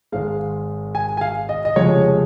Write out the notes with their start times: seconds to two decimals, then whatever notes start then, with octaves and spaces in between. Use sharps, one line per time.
0.12 G#1 G#2 G#3 F5
0.95 G#5
1.17 G#5
1.21 F5
1.49 D#5
1.65 D#5
1.76 F1 F2 C#3 F3 G#3 C#5